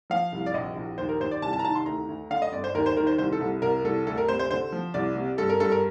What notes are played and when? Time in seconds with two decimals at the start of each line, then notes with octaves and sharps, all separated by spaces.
0.10 F3 F5
0.33 C2
0.46 D5
0.54 A#1 D#5
0.77 A#1
0.98 D#2 C5
1.09 A#4
1.20 D#2 C5
1.31 D5
1.42 C2 A5
1.53 A5
1.59 A#5
1.65 D#3 A5
1.75 C6
1.86 D2 A#5
2.08 D2
2.30 D3 F5
2.42 D#5
2.53 G1 D5
2.64 C5
2.74 D#2 A#4
2.86 C5
2.97 D#3 A#4
3.07 C5
3.18 C2 C5
3.32 A4
3.41 C2
3.62 C2 A#4
3.84 C2 A4
4.07 D2 A4
4.17 A#4
4.29 C3 C5
4.39 C5
4.51 D3 C5
4.72 F3
4.94 C2 D5
5.16 C3
5.38 G2 A4
5.49 A#4
5.60 G2 A4
5.72 A#4